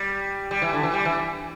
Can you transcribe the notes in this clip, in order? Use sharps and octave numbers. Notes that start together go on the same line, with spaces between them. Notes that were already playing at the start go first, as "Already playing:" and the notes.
Already playing: G3
G3
E3
D3
E3
G3
E3